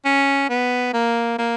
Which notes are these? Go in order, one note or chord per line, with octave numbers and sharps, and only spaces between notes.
C#4
B3
A#3
A#3